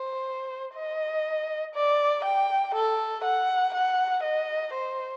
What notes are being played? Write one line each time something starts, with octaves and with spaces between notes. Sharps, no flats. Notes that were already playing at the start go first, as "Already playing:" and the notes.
Already playing: C5
D#5
D5
G5
A4
F#5
F#5
D#5
C5